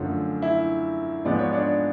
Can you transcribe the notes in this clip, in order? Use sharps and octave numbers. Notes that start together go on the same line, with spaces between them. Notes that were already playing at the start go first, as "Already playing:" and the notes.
Already playing: F#2 D3 F3 A3
E4 E5
G#2 F3 G#3 B3 D5
C#5
D4 D5